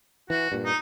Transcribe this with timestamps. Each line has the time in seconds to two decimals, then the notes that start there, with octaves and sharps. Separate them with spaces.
0.30 E3 F#4
0.52 G2 A#2
0.65 D#4